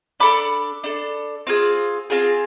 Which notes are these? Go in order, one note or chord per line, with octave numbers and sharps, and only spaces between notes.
D4 A4 B5 D6
D4 A4
C4 F4 G#4
C4 F4 G#4